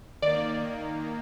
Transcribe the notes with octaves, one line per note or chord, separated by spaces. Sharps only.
D#3 A#3 D5